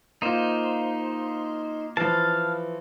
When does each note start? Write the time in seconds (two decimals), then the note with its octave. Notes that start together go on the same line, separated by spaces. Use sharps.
0.22 A#3 D#4 F4 C5
1.97 E3 F3 F5 A5